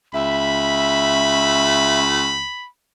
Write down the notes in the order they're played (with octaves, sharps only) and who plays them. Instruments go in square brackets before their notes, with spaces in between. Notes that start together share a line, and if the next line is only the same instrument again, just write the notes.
[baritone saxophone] C#2 [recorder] E5 [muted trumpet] B5